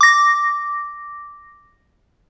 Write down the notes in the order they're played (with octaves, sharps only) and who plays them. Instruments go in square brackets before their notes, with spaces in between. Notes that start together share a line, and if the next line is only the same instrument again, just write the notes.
[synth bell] D6 A#6